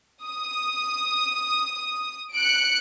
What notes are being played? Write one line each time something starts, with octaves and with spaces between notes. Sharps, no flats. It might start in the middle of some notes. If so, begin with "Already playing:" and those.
D#6
F#6 C#7 D7